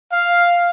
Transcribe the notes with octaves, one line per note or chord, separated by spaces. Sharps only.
F5